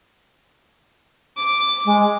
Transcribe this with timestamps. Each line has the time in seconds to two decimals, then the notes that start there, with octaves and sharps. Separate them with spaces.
1.37 D6
1.85 G#3